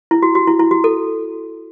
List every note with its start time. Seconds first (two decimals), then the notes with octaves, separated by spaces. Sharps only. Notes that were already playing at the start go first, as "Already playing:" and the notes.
0.11 E4
0.22 F#4
0.35 F#4
0.47 E4
0.59 E4
0.71 F#4
0.84 A4